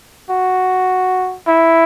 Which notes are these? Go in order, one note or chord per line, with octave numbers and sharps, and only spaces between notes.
F#4
E4